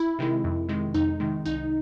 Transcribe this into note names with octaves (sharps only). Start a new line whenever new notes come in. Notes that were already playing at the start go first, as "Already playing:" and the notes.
Already playing: E4
C3 D#3 G#3
F2
C3 D#3 G#3
F2 D#4
C3 D#3 G#3
C2 D#4